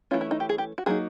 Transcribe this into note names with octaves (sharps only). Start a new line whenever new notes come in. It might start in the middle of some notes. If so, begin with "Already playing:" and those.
E3 A3 C#4 F4
E4
D#4
G4
G#4
G4
F#4
F#3 A#3 D#4 G#4